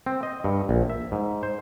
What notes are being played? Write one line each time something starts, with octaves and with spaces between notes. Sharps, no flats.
C4
D#5
G2
A#1
E5
G#2
C5